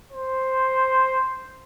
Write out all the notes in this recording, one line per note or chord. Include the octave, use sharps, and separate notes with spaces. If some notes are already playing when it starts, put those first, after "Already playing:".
C5